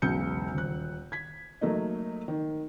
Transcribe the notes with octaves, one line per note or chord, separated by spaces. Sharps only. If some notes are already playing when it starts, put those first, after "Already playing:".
E1 B1 C#3 G6 C#7
D#1 F#6
G#6 B6
F#3 A3 A#3 D#4
D#3